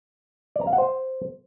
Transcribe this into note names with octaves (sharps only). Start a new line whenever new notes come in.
D5
A#5
F5
F#5
C5